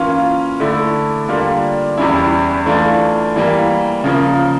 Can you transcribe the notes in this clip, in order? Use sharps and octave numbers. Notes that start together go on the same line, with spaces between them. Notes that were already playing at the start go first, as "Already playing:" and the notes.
Already playing: E3 A#3 C#4 F4
D3 A3 E4
D3 G3 A#3 D4 F4
E2 E3 G3 C#4 E4
E3 A3 D4 F4
E3 G3 A#3
C#3 F3 A#3